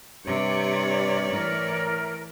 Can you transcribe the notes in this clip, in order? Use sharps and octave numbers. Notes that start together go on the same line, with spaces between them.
G2 C3 C#5 D5
A2 E3 A#4